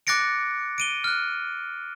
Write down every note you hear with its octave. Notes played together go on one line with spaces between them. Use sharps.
D6 F#6 A6 A#6 C#7 D7
D7 D#7 G7
F6 F#6